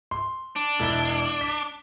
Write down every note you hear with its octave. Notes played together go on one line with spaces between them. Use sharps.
C6
D4
E1 E4 G7
B6